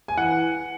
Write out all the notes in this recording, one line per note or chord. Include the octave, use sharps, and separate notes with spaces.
G#5
E3 F#5